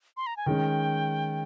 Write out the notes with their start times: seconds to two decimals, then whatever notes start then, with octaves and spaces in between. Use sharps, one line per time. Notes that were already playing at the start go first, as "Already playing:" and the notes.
0.17 C6
0.27 A#5
0.37 G#5
0.46 D#3 G#3 C#4 G5